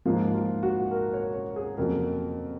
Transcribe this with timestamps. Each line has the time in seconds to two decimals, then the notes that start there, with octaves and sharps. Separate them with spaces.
0.05 G#2 F3 A#3 F4
0.34 F4
0.63 F#4
0.91 A#4
1.13 C#5
1.34 C#5
1.56 G#4
1.77 F2 C#3 F#3 A#3 A#4